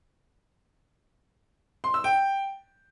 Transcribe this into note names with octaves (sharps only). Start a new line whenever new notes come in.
C6
E6
G5